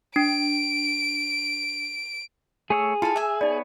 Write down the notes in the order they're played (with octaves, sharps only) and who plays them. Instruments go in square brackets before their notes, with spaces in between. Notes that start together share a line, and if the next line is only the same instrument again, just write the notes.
[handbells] D4 [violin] D7
[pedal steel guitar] A3 C#5 E6 [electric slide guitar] G#4
[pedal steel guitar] E4 F4 [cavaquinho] A4 F5
[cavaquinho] E5 G#5 [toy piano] D6 [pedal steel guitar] E6
[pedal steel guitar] B3 C#5 [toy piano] D#4 D5